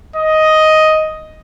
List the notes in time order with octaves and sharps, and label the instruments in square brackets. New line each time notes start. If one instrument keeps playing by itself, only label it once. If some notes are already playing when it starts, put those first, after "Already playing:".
[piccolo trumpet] D#5